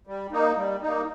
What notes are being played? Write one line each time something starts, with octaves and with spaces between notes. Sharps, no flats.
G3
A#3 D#4
G3
A#3 D#4